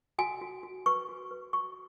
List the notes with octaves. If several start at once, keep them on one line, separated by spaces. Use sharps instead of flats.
F#4 G#5
F#4
F#4
B4 C#6
F#4
B4
F#4 C#6